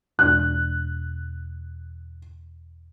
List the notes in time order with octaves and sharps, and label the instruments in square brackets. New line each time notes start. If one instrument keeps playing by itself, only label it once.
[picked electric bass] E1 D4 [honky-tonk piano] F#6